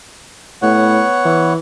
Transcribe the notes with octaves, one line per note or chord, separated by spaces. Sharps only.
A2 B3 C#5 F#5
E3